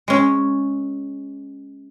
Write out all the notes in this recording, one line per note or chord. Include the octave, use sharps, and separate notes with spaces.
G#3 C#4